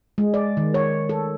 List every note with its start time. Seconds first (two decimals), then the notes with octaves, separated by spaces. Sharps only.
0.18 G#3
0.34 D5
0.57 D#3
0.74 C#5
1.09 A4